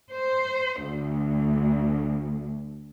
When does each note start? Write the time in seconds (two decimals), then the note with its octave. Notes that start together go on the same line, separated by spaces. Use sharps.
0.11 C5
0.86 D2